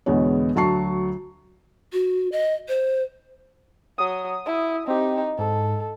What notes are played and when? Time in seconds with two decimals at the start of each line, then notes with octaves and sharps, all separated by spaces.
0.06 E2 B2 D3 G#3 B3 C#5
0.55 D2 F#3 A5 C#6 C7
1.93 F#4
2.32 D#5
2.68 C5
3.98 F#3 D#6
4.46 E4
4.88 C4 D#4 G4
5.38 G#2 A4